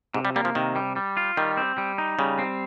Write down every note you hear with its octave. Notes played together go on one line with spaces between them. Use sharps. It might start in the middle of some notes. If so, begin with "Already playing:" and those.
G#2 C3
G3
G3 A#3
F3
C3 D#3
G3
G3
F4
D#3 G3
C4
G3
D#4
C#3 G3
C4